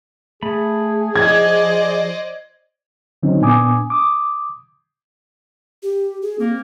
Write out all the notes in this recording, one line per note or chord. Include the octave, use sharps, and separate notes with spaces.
A3 G#4 B5
F3 C5 D5 D#5 G#6
D3 D#3 F#3 C4 C#4 D#4
A#2 B3 D4 G#5 D6 D#6
D6 D#6
G4
G#4
A#3 C4